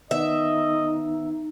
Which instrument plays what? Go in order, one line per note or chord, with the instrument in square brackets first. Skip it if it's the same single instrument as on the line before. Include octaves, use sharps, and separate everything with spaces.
[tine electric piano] D#3 B3 [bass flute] D#4 [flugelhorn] D#5 [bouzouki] E5